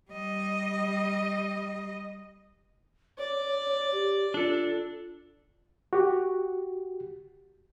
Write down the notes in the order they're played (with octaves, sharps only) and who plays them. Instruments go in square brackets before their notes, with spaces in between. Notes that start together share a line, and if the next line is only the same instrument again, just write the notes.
[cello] G3 D#5
[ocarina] C#5 [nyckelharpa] D5
[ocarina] G4
[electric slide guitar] D4 A4 [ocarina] F4
[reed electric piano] F#4 G4